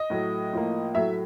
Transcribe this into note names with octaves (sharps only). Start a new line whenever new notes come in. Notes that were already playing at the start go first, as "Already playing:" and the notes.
Already playing: D#5
A2 F#3 A3
A2 F3 A#3
A2 F#3 A3 E5